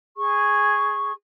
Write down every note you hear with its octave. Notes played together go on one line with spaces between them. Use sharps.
G#4 C#6